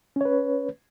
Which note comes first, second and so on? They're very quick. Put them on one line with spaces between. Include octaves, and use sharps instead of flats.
C#4 C#5 B4